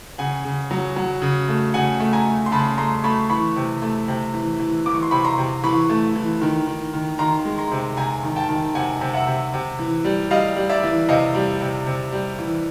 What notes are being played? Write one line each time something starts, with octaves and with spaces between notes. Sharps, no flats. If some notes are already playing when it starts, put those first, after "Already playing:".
C#3 F#5 G#5
C#3
F#3
F#3
C#3
A3
C#3 F#5 G#5
A3
G#5 A#5
A3
C6
C#3 A5 B5
A3 A#5 C6
A3 B5 C#6
E3 B5 C#6
C3
A3
C3
E3
E3
E3 D6
C#6
C6
C3 B5 C#6
A#5 C6
C3
E3 B5 C#6
A3
E3
D#3
D#3
D#3
D#3 A#5 C6
G#3
A#5 C6
C3
C3 G#5 A#5
D#3
G5 A5
D#3
C3 F#5 G#5
C3
E5 F#5
C3
C3
E3
G3
G3 D#5 F5
G3
D5 E5
E3
C3 D#5 F5
G3
C3
C3
G3
E3